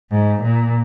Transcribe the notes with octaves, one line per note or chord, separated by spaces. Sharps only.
G#2
A#2